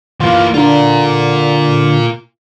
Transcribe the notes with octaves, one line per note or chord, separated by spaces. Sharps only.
E3 A#3 F4
D3 F4 A#4